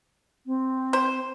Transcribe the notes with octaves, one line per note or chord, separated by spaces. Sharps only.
C4
C5